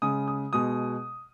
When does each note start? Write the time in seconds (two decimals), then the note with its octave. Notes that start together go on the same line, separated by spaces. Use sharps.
0.02 C#3 G#3 D#6
0.28 D#6
0.53 B2 G#3 D#6